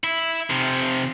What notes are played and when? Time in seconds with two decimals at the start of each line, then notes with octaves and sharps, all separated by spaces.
0.04 E4
0.50 C3 F3